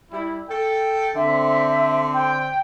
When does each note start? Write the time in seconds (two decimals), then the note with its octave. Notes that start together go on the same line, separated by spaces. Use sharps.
0.11 G3 E4
0.49 A4 G5
1.16 D3 C4 E5
2.14 G5